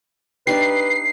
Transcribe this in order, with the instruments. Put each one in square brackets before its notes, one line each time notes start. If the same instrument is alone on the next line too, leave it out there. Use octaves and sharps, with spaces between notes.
[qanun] D4 D#4 G4 [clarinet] B4 [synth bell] C7